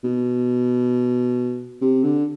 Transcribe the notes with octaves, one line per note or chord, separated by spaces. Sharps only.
B2
C3
D3